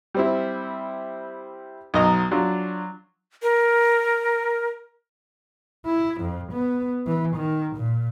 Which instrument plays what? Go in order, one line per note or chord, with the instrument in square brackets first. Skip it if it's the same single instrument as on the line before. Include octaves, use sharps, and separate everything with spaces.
[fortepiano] G3 C4 E4
B1 F#3 D#5 A#5
F#3 D4 F4
[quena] A#4
[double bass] E4
F2
B3
E3
D#3
A#2